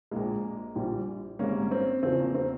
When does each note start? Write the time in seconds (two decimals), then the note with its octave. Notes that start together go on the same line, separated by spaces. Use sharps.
0.11 A#1 A#2 G#3 A#3
0.75 A#1 A#2 G3
1.39 G#1 G#2 G3 A#3 C#4
1.71 C4
2.03 E2 C#3 F3 C4
2.19 A#3
2.35 C4